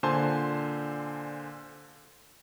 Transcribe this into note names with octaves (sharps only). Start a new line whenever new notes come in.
A#2 D3 C5 G#5 A5 C6